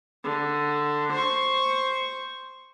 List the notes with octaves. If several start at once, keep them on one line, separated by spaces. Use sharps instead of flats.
D3
C5 C#6